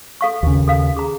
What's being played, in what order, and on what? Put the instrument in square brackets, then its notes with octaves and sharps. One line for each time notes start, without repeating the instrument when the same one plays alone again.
[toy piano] A4 F5 C#6
[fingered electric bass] D#2 C#3
[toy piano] A4 F5
G#4 A#5